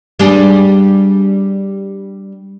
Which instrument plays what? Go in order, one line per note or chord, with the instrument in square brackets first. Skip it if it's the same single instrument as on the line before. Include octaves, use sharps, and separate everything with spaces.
[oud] G3 D4 G#4